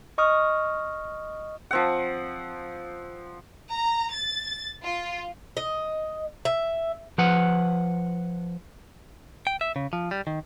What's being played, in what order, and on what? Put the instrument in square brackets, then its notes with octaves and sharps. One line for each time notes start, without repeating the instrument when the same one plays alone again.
[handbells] D#5 C#6 D#6 F6
[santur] F3 C4 F#5
[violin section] A#5
A6
F4
[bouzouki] D#5
E5
[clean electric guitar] F3 B4 F#5
G5
E5
C#3
F3
G3
D#3